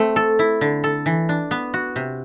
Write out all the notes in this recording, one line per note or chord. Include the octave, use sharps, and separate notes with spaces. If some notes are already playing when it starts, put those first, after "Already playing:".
Already playing: A3 C4
A4
E4
D3
A4
E3
D4
B3
F#4
C3